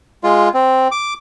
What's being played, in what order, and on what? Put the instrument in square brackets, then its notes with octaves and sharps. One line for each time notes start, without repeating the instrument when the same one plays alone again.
[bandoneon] G#3 F4
C4
D6